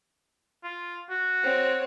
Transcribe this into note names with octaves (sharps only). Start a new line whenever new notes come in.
F4
F#4
C4 C#5